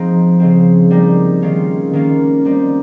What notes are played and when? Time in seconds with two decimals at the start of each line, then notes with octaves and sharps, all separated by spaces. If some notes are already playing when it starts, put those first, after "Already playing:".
Already playing: F3 G#3 C4 D#4
0.40 C#3 G#3 C4
0.90 G3 A#3 D#4
1.42 D#3 G#3 C#4 F4
1.93 D#3 A#3 C#4 F4
2.45 G3 C4 D#4